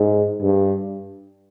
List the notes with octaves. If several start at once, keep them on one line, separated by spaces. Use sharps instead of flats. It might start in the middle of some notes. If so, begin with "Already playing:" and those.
Already playing: G#2
G2